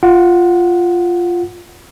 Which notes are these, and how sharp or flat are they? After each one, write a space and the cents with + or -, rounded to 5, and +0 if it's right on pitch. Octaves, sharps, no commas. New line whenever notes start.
F4 +0 F#5 +0